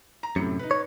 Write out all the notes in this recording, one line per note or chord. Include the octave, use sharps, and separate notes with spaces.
A#5
F#2 A2 C3 C#7
D#4 B4
C#5